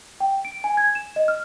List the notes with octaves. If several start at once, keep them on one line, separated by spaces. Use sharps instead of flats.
G5
D7
G#5
G#6
E7
D#5
F6